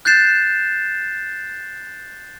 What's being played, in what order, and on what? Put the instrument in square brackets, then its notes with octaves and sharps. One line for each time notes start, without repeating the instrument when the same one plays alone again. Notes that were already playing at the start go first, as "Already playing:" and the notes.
[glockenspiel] F#6 G6 A6 C7 E7